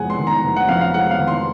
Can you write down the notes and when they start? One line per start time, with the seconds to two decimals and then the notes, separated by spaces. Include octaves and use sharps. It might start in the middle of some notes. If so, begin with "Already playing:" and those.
Already playing: F1 F2 G#3 F#5 G#5
0.10 C6
0.19 D#3
0.27 A#5
0.43 F1
0.56 F#5
0.68 F2 F5
0.81 F5
0.94 G#3 F#5
1.06 F#5
1.11 F5
1.19 D#3
1.28 C6